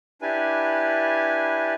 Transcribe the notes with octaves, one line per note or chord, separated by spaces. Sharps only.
D4 E4 G4 B4 G#5